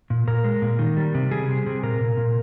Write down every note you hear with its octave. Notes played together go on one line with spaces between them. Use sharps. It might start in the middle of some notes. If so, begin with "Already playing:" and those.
A#2
A#2 A#4
G#3
A#2
D#3
G3
C3
G3 G#4
C3
C3
A#2 A#4
A#2
A#2